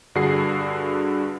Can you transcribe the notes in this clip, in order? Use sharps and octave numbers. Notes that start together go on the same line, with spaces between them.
G2 D3 F#4 G#4 C7